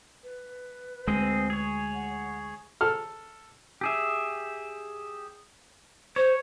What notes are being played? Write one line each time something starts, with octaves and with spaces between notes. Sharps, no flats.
B4
D2 G#3 C4 G#4 D#5
G#4 C#5
F#5
A4 F6
G4 G#4 E5
C5 C#5